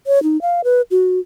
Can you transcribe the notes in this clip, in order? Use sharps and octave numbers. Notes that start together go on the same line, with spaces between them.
C#5
D#4
F5
B4
F#4